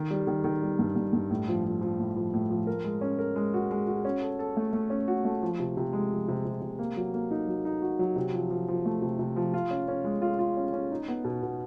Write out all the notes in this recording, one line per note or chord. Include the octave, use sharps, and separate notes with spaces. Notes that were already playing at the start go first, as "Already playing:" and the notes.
Already playing: D#3
G3
D#3
D#3
G3
G2
G2
G2
A2
F3
F3
F3
A2
F3
A2
F3
A#4
G#3
C#4
A#4
G#3
F#4
G#3
F#4
C#4
A4
A4
A3
A3
C#4
F#4
A3
F3
C3
C3
G#3
F3
C3
C3
C3
A#3
F#3
A#3
D#4
F#3
D#4
F#4
F#3
C3
F3
F3
F3
A3
C3
C3
F3
F4
C#4
C#4
G#3
F4
F4
C#4
C#4
D#4
B3
B2
B2